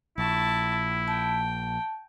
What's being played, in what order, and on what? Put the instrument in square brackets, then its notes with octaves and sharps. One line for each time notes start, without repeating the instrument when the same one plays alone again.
[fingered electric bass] A#1 [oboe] E4 [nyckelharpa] A5 C#6
[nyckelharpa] G5 [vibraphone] A5